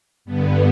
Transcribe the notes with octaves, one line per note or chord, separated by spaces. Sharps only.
G2 D3 B3